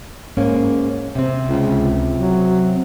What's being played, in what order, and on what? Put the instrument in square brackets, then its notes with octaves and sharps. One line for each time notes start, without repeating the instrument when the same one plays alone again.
[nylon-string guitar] G#2 A#3 C#4
C3 C4
[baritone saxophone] C#2
F#3